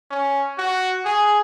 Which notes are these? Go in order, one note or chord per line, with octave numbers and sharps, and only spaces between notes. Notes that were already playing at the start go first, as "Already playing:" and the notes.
C#4
F#4
G#4